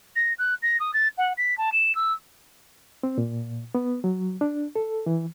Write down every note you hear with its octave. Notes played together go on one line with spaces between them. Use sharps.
A#6
F#6
A#6
D#6
A6
F#5
B6
A5
E7
E6
C4
A#2
B3
F#3
D4
A4
E3